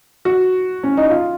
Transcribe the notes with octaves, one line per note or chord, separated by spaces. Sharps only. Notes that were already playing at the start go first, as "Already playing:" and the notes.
F#4
C#4
D#4
F4